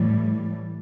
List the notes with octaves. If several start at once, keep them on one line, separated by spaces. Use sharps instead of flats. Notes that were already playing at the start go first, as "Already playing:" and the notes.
Already playing: A2 E3 G3